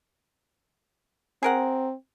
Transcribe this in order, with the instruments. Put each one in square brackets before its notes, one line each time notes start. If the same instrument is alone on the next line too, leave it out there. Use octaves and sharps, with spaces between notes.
[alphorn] C4 [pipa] G#4 A#4 F#5